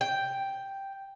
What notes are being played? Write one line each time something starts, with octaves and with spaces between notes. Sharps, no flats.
G5